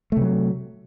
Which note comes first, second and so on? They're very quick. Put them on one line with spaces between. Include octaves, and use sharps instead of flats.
A3 C3 F#3